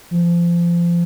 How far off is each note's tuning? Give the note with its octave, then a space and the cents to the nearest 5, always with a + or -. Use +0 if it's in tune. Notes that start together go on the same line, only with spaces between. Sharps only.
F3 -25